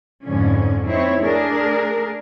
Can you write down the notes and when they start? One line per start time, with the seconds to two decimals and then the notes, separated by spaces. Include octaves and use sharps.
0.23 F2 G#2 D3 F3 C#4
0.85 C4 D#4 E4 C#5
1.20 A3 D4 G#4 A#4